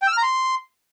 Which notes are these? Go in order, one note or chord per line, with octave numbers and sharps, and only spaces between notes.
G5
E6
F6
A#5
C6